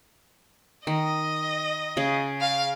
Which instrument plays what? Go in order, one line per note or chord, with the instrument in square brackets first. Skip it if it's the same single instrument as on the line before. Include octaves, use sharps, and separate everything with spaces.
[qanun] D#3 [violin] D#5
[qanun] C#3 G#4
[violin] F5